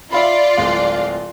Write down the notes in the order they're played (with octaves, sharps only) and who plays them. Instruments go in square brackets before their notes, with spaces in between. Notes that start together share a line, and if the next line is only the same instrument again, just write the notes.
[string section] F4 D5 [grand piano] E5 F5 B5
[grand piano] D1 G#3 F5